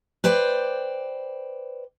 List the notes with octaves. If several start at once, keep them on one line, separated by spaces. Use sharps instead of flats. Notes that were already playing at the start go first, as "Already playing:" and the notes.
B4 C5 D5 G5